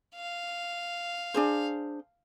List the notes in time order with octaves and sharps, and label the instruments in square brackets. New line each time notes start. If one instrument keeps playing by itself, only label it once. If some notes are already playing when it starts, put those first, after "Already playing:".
[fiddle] F5
[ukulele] D4 G#4 C5